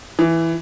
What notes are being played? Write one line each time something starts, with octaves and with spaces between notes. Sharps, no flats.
E3